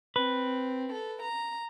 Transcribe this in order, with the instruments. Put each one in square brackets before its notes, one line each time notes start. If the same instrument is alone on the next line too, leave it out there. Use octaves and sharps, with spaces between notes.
[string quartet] C4 [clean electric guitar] B4
[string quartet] A4
A#5